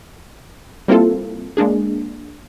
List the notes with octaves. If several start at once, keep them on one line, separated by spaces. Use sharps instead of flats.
G3 A#3 C4 E4 F4 A4
G#3 A#3 D4 G#4